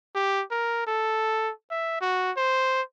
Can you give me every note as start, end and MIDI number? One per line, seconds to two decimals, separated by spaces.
0.15 0.43 67
0.51 0.86 70
0.87 1.51 69
1.71 1.96 76
2.01 2.32 66
2.37 2.82 72